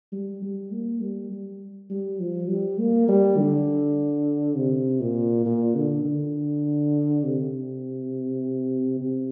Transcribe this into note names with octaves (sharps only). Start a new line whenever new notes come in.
G3
G3
A#3
G3
G3
G3
F3
G3
A#3
G3
D3
C3
A#2
A#2
D3
D3
C3
C3